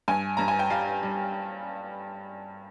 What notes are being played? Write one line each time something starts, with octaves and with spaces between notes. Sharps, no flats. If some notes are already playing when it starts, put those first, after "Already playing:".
G2 G#5
G2 A#5
G#5
G5
G3 F5
G3